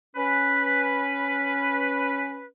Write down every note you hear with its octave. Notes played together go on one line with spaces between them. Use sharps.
C#4 B4